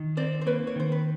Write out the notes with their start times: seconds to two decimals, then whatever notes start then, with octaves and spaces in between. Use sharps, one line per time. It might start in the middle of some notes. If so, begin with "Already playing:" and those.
Already playing: D#3
0.17 C4 C5 D5
0.41 C5
0.46 A#3 B4 C#5
0.67 C#5
0.76 D#3 C5
0.92 B4